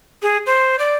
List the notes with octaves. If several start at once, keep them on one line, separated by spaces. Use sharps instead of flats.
G#4
C5
D5